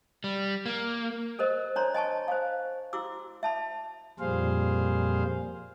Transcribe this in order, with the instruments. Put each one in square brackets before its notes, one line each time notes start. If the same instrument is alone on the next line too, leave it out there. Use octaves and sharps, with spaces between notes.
[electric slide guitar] G3
A#3
[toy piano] A4 A#4 C5 D#5
D4 C5 C#5 A#5 C6
D#5 G#5 A5 C#6
C5 F5
E4 F#4 D6 E6
E5 A5 B5
[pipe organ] F2 A#2 G3 G#4 C5 F5